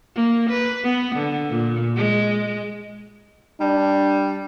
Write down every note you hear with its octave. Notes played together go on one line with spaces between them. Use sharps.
A#3
B4
B3
D3
A#2
G#3
G3 D4